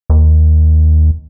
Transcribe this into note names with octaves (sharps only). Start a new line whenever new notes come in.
D#2